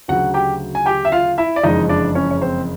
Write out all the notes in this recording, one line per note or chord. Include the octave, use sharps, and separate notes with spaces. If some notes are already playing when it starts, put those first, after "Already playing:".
D2 C#3 F#3 F#4 F#5
G4 G5
G#5
G4 G5
E5
F4 F5
E4 E5
D5
F#1 F2 C#3 E3 G#3 D#4 D#5
D4 D5
C#4 C#5
C#5
C4 C5